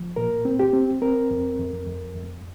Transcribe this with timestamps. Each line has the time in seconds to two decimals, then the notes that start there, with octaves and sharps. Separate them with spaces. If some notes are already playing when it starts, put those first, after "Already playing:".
Already playing: F3
0.16 A#2 A#4
0.45 C4
0.59 G4
0.73 C4
1.02 C4 A#4
1.31 F2
1.59 F2
1.87 F2
2.16 F2